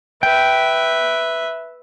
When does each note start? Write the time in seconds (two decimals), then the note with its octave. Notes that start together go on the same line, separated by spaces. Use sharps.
0.23 B4 E5 G5